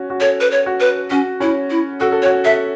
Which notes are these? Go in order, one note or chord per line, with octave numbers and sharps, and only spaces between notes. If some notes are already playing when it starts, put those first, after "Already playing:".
Already playing: C#4 F#4
F#4
A4 C#5
B4
C#5
F#4
B4
C#4 F#4
C#4 E4
E4
F#4 A4
A4
C#5
F#4
A4 E5